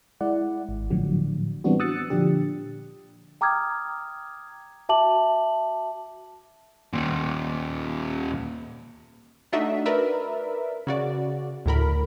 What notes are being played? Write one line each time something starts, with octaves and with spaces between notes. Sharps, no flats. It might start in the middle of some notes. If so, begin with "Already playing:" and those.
G#3 E4 D5 F#5
G#1
A2 D3 F3 F#3
E3 G3 B3 C4 D4 F#4
D#6 E6 F#6 A6 C#7
A#2 D3 F3 D4 G4
G5 A#5 D6 D#6 F6 G#6
F#4 E5 A5 D6 F#7
D#2 A#2
A3 D4 D#4 F#4 E5
A#4 B4 D5 E5
C#3 F#4 D5
D2 A2 A#4 B5